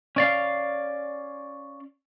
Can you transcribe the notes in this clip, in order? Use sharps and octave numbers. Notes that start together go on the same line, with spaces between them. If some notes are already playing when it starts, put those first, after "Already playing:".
C#4 D5 F5